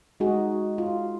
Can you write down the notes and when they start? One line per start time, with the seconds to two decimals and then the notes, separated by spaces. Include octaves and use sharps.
0.20 G#3 D#4 F#4 G#4
0.78 F4